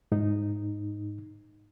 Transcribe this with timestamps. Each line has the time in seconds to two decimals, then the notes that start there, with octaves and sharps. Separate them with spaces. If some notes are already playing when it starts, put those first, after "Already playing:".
0.12 G#2 D#4